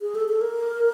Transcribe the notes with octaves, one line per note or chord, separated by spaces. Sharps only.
G#4
A4
A4
A#4